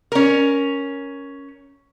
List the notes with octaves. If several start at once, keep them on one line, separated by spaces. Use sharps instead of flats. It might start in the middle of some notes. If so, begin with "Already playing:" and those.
C#4 A#4